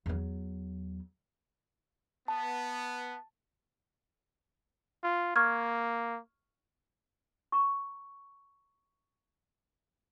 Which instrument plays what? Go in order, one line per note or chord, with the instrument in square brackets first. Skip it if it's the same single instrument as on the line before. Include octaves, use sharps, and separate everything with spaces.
[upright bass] E2 F#3
[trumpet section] B3 [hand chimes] A5
[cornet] F4
[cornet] A#3 [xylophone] C#6 F6 G#6
[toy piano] A#5 C#6